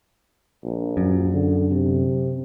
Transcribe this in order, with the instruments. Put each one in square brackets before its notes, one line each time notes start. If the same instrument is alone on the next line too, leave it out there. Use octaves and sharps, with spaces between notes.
[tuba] A#1
[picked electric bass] F#2
[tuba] D3
C3